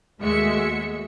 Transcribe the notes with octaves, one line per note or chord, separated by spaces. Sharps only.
D#2 G#3 A3 F#4 E5 C#7